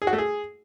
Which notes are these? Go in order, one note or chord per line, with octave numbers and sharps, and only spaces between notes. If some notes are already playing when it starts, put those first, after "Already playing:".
G#4
F#4
A3
G#4